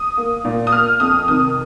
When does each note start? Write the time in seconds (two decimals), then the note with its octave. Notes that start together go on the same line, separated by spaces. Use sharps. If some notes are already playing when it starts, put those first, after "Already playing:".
Already playing: D#6
0.17 A#3
0.44 A#2
0.67 D#6
0.72 A#3 F6
1.00 F2 D#6
1.28 C3 D#3 D#6